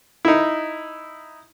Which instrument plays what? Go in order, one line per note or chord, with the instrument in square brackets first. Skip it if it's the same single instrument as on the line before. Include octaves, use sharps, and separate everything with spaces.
[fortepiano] D#4 E4